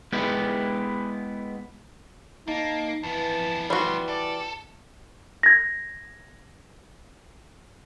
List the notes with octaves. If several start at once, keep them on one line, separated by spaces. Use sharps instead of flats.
G#3 B3 E4 G4
A#3 D#4 A5
F2 E3 B3 A5
E3 G3 F#4 C6
A4 D5
G#6 A#6